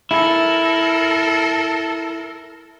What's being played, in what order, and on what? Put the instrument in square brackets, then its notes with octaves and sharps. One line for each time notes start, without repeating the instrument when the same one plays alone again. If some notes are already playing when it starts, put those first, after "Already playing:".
[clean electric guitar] E4 [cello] A4 A#4